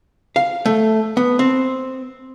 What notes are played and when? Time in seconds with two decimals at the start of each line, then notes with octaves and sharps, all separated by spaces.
0.36 F5
0.66 A3
1.17 B3
1.39 C4